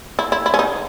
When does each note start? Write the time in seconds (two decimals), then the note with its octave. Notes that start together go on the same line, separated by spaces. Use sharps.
0.19 E4
0.32 E4
0.46 E4
0.54 C#4
0.59 D#4